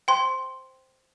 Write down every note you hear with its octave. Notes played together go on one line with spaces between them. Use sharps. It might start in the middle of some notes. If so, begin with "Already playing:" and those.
C5 G5 C6